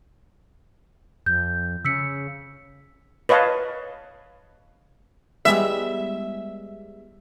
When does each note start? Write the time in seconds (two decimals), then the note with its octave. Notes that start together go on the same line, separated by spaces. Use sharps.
1.26 F2 G6
1.85 C#3 E6 B6 C#7
3.29 B4 C#5 D#5 F5 A5
5.45 G3 G#3 B3 E5